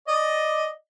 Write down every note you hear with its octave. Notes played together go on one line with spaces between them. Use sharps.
D5 D#5